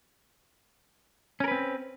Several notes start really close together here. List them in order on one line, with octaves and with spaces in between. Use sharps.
C#4 A#4 B4 C4